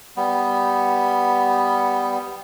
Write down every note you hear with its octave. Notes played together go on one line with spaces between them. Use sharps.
G3 B3